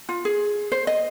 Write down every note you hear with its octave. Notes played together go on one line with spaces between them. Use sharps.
F4
G#4
C5
D#5